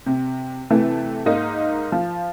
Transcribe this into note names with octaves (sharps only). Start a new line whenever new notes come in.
C3
C3 E3 A3
G#2 A#3 D#4
F3